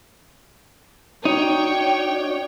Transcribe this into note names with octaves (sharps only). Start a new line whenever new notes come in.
D4 D#4 F#4 C#5 D5 G5